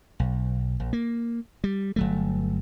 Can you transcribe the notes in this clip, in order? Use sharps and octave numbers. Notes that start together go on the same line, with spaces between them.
B1
A#1
A#3
G3
G1 F#3 A3